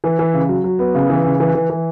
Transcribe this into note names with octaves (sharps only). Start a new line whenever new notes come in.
E3
E3
C#3
F#3
F#3
B3
C#3
E3
C#3
E3
E3
E3